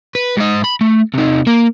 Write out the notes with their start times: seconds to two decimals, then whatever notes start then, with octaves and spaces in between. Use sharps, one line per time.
0.15 B4
0.37 G#2 D#5
0.64 B5
0.81 A3
1.14 C3 D#4
1.47 A#3